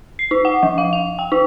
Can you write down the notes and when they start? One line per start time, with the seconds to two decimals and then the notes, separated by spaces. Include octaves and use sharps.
0.19 C7
0.31 D#4
0.45 F#5
0.63 F3
0.78 F5
0.93 F7
1.19 G5
1.32 D#4